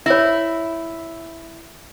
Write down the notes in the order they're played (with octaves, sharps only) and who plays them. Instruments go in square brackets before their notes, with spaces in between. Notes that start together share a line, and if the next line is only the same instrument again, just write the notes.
[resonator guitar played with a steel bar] E4 [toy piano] C#5 E5